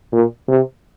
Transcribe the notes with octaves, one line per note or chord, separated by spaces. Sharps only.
A#2
C3